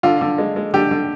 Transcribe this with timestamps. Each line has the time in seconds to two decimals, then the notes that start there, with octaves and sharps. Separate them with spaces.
0.03 D3 F4
0.21 D3
0.38 G#3
0.56 G#3
0.74 D3 G4
0.91 D3